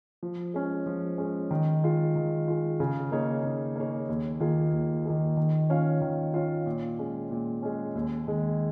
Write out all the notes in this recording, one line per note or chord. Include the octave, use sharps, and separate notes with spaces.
F3
G#3 C#4
F3
G#3 C#4
D#3
G#3 F4
D#3
G#3 F4
C#3
A#3 D#4 G#4 C#5
C#3
A#3 D#4 G#4 C#5
D#2
D#3 A#3 F4 G#4
D#2
D#3 A#3 F4 G#4
D#3
C#4 F4 C#5 F5
D#3
C#4 F4 C#5 F5
A#2
G#3 C#4
A#2
G#3 C#4
D#2
D#3 G#3